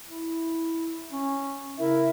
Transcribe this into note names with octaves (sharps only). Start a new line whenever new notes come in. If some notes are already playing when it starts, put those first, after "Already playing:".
E4
C#4
C#3 E4 A#4 E5